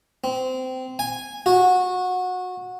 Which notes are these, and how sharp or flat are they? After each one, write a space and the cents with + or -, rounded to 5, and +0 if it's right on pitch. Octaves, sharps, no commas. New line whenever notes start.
C4 -20
G#5 -10
F#4 -20